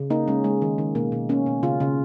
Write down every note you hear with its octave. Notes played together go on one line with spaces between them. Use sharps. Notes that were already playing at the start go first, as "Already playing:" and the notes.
Already playing: C#3
A#3 D#4
G#3 C#4
G#3
D#3
D#3
B2 A#3
B2
A#3 C#4
B2
C#3 F4
C#3